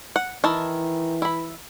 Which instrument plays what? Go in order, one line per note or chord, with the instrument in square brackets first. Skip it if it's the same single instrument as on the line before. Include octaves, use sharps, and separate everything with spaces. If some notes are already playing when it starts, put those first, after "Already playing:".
[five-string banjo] F#5
[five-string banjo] D#3 E4 A5 [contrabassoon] E3
[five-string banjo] E4 B5